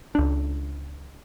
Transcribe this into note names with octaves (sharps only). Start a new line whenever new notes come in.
C#2 D4